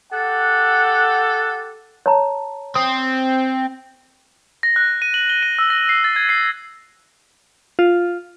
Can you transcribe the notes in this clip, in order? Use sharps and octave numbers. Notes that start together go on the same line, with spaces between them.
G4 A4 F#5
C#5 A5 A#5
C4 D#6
A#6
F#6
D#7
F#7
G7
D#7
E6
A#6
C7
A6
G#6
C7
F4